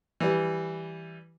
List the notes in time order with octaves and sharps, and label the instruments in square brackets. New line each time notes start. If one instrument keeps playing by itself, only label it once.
[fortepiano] E3 G3